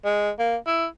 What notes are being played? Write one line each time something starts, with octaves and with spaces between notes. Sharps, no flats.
G#3
A#3
E4